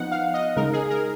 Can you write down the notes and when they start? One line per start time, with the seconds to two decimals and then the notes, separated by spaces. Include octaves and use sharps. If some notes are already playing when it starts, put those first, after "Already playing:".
Already playing: F3 B3 D#4 F#5
0.12 F5
0.34 D#5
0.57 C#3 G#3 D#4 A#4
0.73 G#4
0.90 A#4